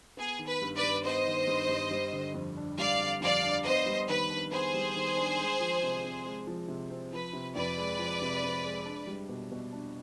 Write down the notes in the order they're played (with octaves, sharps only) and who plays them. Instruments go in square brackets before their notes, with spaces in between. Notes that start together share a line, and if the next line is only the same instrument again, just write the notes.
[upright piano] B3 [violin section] G#4
[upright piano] D#3
[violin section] B4
[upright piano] G2
[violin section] B4 D5
[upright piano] G2
[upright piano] B3 [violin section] C5 D#5
[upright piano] D#3
G2
G2
G3
D3
F2
D4
[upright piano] G3 [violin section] D5 F5
[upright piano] D3
[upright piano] F2 [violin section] D5 F5
[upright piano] D4
[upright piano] B3 [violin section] C5 D#5
[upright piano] G3
[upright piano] D#3 [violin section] B4
[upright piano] D4
[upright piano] B3 [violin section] G#4 C5
[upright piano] G3
D#3
D4
G#3
F3
C3
C4
G#3
F3
C3
C4
[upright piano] F3 [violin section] B4
[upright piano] C3
[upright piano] F2 [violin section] B4 D5
[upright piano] G#3
F3
C3
F2
G#3
D4
G3
B2
B2
D4